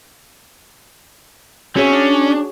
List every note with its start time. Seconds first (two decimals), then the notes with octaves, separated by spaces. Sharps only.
1.76 C4 C#4 F#4 G#4 C#5 E5
1.93 D4